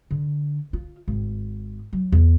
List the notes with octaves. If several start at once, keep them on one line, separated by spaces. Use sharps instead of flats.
D3
F4
G#1
F#3
E2